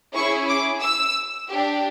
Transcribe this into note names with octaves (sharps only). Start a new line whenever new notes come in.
C#4 E4 G#4 C#6
D6
E6
D4 G4